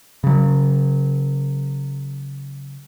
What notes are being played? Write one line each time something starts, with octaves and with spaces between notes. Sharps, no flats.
C#3 F#3